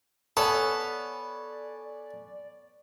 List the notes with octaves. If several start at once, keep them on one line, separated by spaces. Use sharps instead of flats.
B3 A4 C#5 D5 G#5